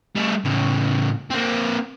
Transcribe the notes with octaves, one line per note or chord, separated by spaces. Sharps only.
G3 A3
A2 C#3
A#3 C4